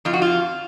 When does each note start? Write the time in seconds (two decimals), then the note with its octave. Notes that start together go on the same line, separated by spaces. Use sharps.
0.05 F2 F4
0.13 F#4
0.22 F4